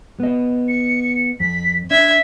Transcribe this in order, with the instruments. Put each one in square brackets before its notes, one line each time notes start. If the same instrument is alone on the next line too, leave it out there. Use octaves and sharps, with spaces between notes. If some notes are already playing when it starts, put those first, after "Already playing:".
[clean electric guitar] B3 D#5
[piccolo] C#7
[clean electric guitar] F2 [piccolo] B6
[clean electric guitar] D4 [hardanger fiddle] E5 [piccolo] G#6